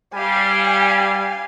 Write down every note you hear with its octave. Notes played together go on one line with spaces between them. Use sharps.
G3 F5 G#5